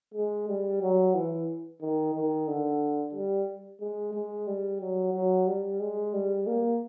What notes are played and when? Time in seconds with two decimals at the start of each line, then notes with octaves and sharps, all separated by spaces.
0.15 G#3
0.48 G3
0.82 F#3
1.15 E3
1.81 D#3
2.15 D#3
2.48 D3
3.14 G3
3.81 G#3
4.14 G#3
4.47 G3
4.81 F#3
5.14 F#3
5.47 G3
5.80 G#3
6.14 G3
6.47 A#3